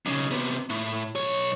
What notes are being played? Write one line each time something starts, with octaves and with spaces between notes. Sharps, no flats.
B1 C#3
C3 B3
A2
B1 C#5